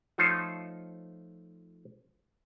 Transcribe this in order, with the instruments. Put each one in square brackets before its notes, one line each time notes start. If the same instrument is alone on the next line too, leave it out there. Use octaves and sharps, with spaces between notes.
[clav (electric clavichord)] F3 A3 D#4 F4 C5 C#5